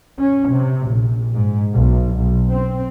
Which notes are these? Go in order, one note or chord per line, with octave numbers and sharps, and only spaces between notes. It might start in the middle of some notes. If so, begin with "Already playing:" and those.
C#4
C3
A#1
G#2
B1
B1
C4